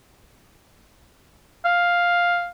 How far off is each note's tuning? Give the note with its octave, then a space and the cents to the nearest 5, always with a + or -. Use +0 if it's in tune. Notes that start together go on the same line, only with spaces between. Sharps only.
F5 +5